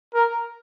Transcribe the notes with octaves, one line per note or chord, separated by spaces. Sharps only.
A#4